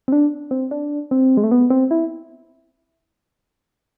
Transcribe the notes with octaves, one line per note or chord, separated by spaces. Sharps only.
C4
D4
C4
D4
C4
G#3
A3
B3
C4
E4